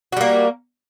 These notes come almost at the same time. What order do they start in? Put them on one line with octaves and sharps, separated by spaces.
F#4 G3 A#3